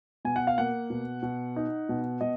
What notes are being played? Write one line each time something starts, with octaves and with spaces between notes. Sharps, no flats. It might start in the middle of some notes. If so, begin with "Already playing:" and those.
B2 G#5
F#5
F5
A#3 F#5
B2
B2
D#4
B2
B2 D#5